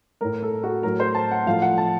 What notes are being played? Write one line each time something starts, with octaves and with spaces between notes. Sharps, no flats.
A2 A3 A#4
A4
F#4
A2 F#3 A3 A#4
C5
A5
F#5
A2 F3 A3 F5
F#5
A5